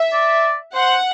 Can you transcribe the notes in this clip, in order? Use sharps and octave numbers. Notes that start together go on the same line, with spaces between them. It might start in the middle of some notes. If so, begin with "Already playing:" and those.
Already playing: E5
D5
C5 F#5